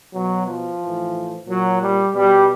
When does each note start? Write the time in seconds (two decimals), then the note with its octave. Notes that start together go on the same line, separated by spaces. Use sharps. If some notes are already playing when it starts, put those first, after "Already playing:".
0.14 B2 F#3
0.47 F3
0.81 A2 E3
1.48 A#2 F#3
1.81 G3
2.15 B2 G3